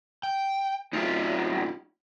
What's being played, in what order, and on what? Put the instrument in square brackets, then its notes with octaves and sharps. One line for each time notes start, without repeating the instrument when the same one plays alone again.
[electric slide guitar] G5
[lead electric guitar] D2 F#3 [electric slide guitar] D#4 F4